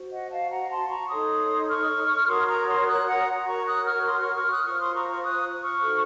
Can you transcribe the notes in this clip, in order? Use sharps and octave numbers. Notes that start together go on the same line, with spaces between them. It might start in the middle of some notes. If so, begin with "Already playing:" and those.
Already playing: F#4 C5
D#5 F#5
F5 A5
F#5 A#5
A5 C6
A#5 C#6
D#4 A4 C#5 C6 D#6
C#6 F6
F#4 A#4 C#5 C6 D#6
A#5 C#6
C6 D#6
D#6 F#6
F#5 A#5
F#4 A#4 C#5 A#5 C#6
D#6 F#6
C#6 F6
C6 D#6
C#6 F6
C#6 F6
D#6 F#6
F4 C5 C#6 F6
C6 D#6
A#5 C#6
A#5 C#6
D#6 F#6
C#6 F6
D#4 F#4 A4 C5